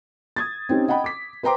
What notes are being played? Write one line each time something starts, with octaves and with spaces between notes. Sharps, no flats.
D#6 G#6 A6
C4 C#4 D#4 G4
D#5 F#5 G5 B5
D6 B6
B4 C5 G5 A#5 C6 D6